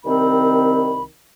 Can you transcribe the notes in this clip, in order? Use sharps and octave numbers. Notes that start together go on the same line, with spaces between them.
C2 D#3 C4 B5